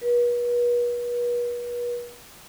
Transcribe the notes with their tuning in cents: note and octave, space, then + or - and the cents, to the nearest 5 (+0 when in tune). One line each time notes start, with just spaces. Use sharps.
B4 -40